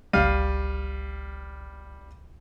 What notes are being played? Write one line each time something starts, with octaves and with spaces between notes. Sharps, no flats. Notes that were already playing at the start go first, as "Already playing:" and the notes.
G1 C#2 G3 F5 D#7